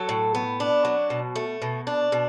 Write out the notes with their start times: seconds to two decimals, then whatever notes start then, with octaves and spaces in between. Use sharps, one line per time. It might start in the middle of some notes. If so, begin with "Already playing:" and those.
Already playing: F#3 A4
0.09 A2
0.35 B3
0.60 D4
0.85 F#3
1.10 B2
1.36 A3
1.62 B2
1.87 D4
2.12 B2